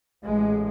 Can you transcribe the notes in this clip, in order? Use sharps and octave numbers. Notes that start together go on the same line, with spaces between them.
A1 A2 G#3